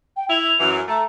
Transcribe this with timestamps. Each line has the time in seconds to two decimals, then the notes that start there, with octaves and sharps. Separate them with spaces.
0.17 G5
0.30 E4 F7
0.60 F#2 E3
0.88 A3 A#5